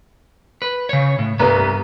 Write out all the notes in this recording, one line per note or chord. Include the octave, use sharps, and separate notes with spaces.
B4
C#3 C#5
A2
C2 G2 B3 B4